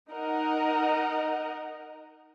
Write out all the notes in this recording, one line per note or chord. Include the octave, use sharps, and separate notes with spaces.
D#4 A#4 D#5 F#5